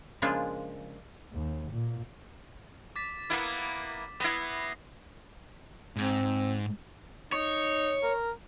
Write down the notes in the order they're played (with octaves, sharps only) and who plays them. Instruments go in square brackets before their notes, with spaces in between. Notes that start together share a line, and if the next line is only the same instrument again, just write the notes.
[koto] C#3 F3 G#3 A#3 D4 F4
[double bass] D#2
A#2
[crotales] D6 A6 B6
[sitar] A#3 B3 E4
[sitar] B3 E4 [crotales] D#6 A#6 C7
[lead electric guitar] G#2 [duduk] C4
[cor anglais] D#4 [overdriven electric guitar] C#5
[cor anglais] A#4